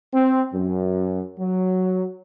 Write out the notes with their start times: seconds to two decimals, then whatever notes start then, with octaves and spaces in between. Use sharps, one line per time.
0.14 C4
0.53 F#2
1.39 F#3